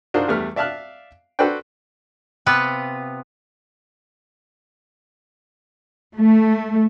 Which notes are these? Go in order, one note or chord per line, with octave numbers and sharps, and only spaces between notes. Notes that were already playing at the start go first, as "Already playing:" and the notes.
D4 D#4 F4 F#4 A#4 C5
E2 G3 A3 B4 F6
D5 E5 F5 A5 F6 F#6
F#4 A4 B4 C5 D5 G5
C3 B3 F4 B4
A3